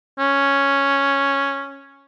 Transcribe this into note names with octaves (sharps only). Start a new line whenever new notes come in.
C#4